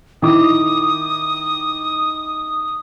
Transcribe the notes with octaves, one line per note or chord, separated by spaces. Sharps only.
D#3 E4 D6 D#6